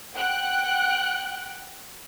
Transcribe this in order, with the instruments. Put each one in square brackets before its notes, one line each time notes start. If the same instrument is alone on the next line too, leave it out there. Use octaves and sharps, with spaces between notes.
[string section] F#5 G5 F#6